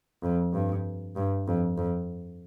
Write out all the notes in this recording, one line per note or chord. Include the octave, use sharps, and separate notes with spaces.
F2
G2
G2
F2
F2